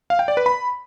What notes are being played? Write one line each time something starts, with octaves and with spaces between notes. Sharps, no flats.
F5
G5
D5
B4
B5